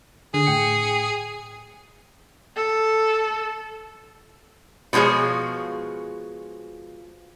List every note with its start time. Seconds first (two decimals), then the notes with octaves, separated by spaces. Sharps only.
0.34 D3 G#4
0.47 A2 G5 C#7
2.56 A4
4.93 B2 F3 G#3 G#4 C#5